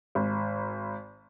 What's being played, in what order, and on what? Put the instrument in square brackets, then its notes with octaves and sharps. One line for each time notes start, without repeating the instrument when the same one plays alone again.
[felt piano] G#1